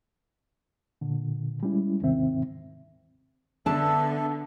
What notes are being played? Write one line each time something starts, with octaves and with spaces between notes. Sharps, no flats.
A#2 D3
G3 G#3 C#4 E4
D#2 G#2 C3 D#3 C4 E5
D3 B3 D4 A4 E5 A5